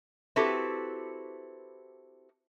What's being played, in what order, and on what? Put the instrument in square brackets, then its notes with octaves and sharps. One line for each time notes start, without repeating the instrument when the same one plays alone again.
[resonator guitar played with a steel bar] C4 E4 F#4 G4 A4 B4